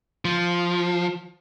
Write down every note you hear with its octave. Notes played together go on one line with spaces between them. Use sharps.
F3